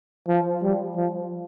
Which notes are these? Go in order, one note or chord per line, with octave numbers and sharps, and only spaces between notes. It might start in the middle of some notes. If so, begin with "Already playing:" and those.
F3
G3
F3